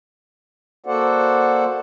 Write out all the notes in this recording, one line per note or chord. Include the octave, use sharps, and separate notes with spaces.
A#3 F#4 A4 C5 D5 F#5